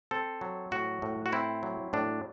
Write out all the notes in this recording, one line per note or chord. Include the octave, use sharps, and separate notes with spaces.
C4 A4
F#3
A2 F#4
A2
F#4
C4 E4
F#3
A2 D4